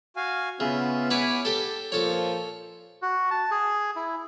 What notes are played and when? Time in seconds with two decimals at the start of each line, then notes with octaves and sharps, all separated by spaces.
0.16 F#4 F5 G#5
0.60 C#3 B3 C#4 F4 E5
1.11 E4 B4 C#5 G#5 B5 D6
1.45 G4 A4 A5
1.92 A#2 F3 A4 C#5 C#6
3.02 F#4
3.31 A5
3.51 G#4
3.96 E4